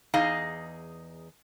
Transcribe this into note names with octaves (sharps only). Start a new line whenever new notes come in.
E2 D#4 G#4 D#5 F5